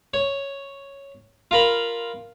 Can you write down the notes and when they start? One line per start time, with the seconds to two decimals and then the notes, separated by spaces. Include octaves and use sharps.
0.14 C#5
1.51 F4 A#4 B5